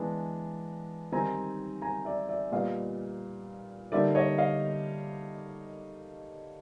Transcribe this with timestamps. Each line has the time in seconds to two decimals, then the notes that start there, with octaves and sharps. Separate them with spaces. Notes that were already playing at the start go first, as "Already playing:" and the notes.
Already playing: E3 G#3 B3 D4
1.12 D#3 G3 C4 D#4 G#5 A#5
1.82 G#5 A#5
2.05 D5 E5
2.29 D5 E5
2.52 A#2 G3 B3 D#5 F5
3.92 D3 G3 A#3 D#4 D5 E5
4.15 C#5 D#5
4.38 D#5 F5